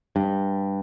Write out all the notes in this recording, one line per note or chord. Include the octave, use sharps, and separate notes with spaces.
G2